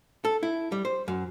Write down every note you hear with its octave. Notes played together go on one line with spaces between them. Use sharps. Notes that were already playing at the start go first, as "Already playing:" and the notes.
A4
E4
G3
C5
F#2